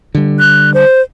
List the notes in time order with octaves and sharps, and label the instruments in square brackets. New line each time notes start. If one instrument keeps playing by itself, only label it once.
[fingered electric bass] D3 G3
[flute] F#6
C5